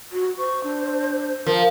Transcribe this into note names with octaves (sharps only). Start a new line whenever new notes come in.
F#4
C5 C#6
D4
F3 A#4